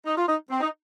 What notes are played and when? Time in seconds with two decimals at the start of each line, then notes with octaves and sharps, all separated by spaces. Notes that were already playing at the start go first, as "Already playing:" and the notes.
0.05 D#4
0.17 F4
0.28 D#4
0.49 C4
0.61 D#4